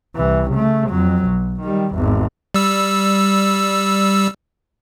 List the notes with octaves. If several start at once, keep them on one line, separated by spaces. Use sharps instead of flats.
C2 E3
C#3 A3
F2 F#3
B1
D#3 G3
G#1 E2
G3 E6